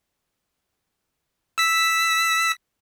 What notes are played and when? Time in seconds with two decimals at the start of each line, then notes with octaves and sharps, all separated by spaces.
1.58 E6 B6